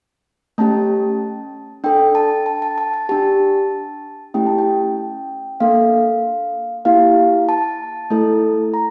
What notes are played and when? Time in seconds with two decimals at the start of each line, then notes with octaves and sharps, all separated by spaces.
0.58 A3 C#4 G4 A5
1.84 D4 A4 G5
2.15 A5
2.46 A5
2.62 A5
2.78 A5
2.94 A5
3.09 D4 G4 A5
4.34 A3 C#4 E4 G4 G5
4.46 A5
4.58 G5
5.60 A#3 D4 A4 F5
6.85 A#3 E4 G4 F5
7.49 A5
8.10 A3 E4 A4
8.74 A#5